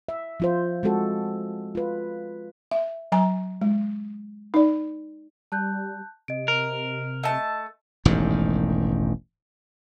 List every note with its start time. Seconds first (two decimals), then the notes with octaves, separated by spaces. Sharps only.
0.09 E5
0.40 F3 F4 C5
0.83 G#3 C4 F#4 A4
1.75 F4 B4
2.71 E5
3.12 F#3 G#5 A#5
3.62 G#3
4.54 D#4 D5
5.52 G3 A5 F#6 G6
6.28 C3 D#5 D7
6.48 A#4
7.23 A3 D#5 A5
8.05 E1 A1 G#2 D#3